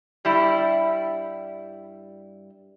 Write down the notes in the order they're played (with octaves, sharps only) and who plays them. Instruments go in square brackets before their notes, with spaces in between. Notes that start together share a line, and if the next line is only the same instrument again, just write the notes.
[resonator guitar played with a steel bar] G2 G3 E4